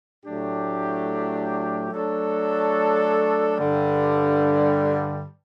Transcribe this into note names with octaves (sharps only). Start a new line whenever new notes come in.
A2 F#3 A3 D4 G4
F#3 A3 D4 A4 C#5
G2 D3 G3